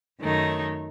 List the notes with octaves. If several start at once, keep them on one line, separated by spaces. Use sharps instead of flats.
F#2 D#3 A3 D#4 C#5